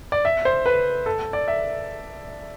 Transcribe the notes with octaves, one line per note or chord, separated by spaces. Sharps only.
D5
E5
C5
B4
A4
D5
E5